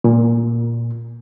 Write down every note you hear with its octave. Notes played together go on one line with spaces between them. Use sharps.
A#2